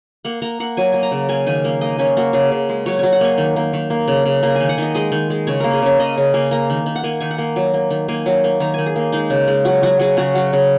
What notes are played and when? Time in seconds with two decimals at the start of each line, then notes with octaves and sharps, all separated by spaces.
0.25 A#3 F#5
0.42 A#3 A#5
0.60 A#3 F#5
0.77 F#3 G#5
0.92 A#3 G#5
1.03 A#5
1.11 C#3
1.29 A#3 G#5
1.46 D#3 G#5
1.64 A#3
1.81 A#3 D#5
1.98 A#3 C#4
2.17 A#3 F#4
2.33 C#3 G#4
2.52 C#3
2.69 G#3
2.86 F#3 C#5
2.99 F#3 C#5
3.12 F#5
3.21 A#3 G#5
3.38 D#3
3.56 A#3
3.73 D#3
3.90 A#3
4.08 C#3
4.25 C#3
4.43 A#3 A#5
4.56 D#3 G#5
4.69 F#5
4.78 D#3 D#5
4.94 G#3 D#5
5.12 D#3
5.30 G#3
5.47 C#3 C#5
5.60 A#3 A#4
5.73 G#4
5.82 C#3 C#4
6.00 C#3 D#5
6.18 C#3
6.34 A#3 G#5
6.51 A#3 A#5
6.70 D#3
6.86 D#3
6.96 F#5
7.03 A#3 G#5
7.20 D#3 G#5
7.31 F#5
7.38 A#3
7.56 F#3
7.74 A#3
7.91 D#3
8.08 A#3 G#5
8.26 F#3
8.44 A#3
8.60 D#3 A#5
8.74 D#3 G#5
8.86 G#4
8.96 A#3
9.12 G#3 D#4
9.30 C#3
9.48 G#3
9.65 F#3 F#4
9.83 F#3 F#4
10.00 F#3 G#4
10.17 C#3 F#4
10.35 F#3
10.53 C#3